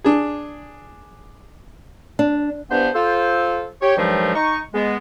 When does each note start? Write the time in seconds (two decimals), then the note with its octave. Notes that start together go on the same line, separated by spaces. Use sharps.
0.04 D4 G#4
2.19 D4
2.71 G2 E3 B3 D4 C5
2.95 F4 A4 C5
3.81 G4 C#5
3.97 G2 D#3 F3 F#3 G#3 A3
4.35 D#4 C#6
4.74 G#3 B3